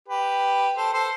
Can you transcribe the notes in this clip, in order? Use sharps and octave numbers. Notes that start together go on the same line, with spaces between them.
G4 B4
A4 C5
A4 C5